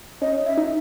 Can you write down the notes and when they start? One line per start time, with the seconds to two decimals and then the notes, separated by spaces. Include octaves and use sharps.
0.22 C#4 D#5
0.46 E5
0.58 D#4